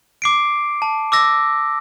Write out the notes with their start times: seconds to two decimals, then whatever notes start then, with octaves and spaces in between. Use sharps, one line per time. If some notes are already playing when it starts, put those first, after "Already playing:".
0.22 D6 C7 D7
0.82 A5
1.12 D6 E6 A#6